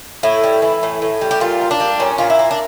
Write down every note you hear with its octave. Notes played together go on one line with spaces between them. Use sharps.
A2 E4
G3
E3
A2
A2
G3
G4
A#2 F4
A#3
D4
G3
A#2 C#4
A#2 F4
E4
A#3
D4